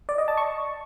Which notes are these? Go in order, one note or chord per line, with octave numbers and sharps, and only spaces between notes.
D5
D#5
A5
C#6